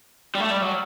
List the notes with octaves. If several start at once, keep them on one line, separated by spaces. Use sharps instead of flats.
G3
A3
G3
F#3